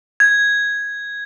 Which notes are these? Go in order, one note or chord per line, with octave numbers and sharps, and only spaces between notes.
G#6